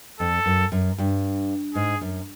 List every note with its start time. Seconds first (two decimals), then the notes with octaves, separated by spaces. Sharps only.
0.20 F2 A4
0.46 F#2
0.72 F#2
0.98 G2
1.75 G#2 G#4
2.01 F#2